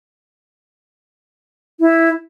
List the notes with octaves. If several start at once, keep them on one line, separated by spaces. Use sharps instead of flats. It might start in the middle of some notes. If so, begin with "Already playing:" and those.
E4